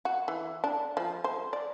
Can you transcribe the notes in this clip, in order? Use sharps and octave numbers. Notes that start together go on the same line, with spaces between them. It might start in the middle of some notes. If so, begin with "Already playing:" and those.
F#4
E3
D4
F3
C5
D5